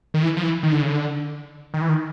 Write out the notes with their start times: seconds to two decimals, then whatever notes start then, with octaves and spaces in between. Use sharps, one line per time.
0.14 D#3
0.23 E3
0.37 F3
0.43 E3
0.63 D#3
0.72 D3
0.82 C#3
0.89 D3
1.74 D#3
1.81 E3
1.89 D#3